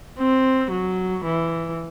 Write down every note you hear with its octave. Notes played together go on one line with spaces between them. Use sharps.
C4
F#3
E3